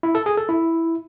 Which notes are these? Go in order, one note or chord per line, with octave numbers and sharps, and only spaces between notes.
E4
A4
G#4
A4
E4